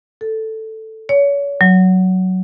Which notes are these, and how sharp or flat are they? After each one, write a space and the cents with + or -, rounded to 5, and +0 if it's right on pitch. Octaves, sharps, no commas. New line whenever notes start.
A4 +5
C#5 +35
F#3 +5